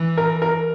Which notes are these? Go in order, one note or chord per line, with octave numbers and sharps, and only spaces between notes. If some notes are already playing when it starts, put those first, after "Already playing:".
Already playing: E3
A#4
A#4